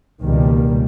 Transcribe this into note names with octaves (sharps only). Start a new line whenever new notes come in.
C#2 B2 D#3 G3 A#3